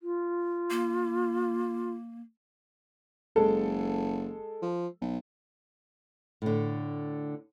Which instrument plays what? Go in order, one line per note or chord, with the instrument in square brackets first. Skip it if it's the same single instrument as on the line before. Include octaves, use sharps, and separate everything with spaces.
[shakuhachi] F4
[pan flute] A#3
[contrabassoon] F#1 [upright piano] G#3 A4
[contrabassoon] F3
B1
[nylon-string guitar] A2 D3